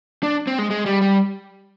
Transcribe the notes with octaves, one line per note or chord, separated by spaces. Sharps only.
D4
C4
G#3
G#3
G3
G3